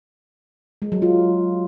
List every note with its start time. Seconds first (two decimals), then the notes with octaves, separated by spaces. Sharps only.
0.82 G#3
0.92 F#3
1.02 F4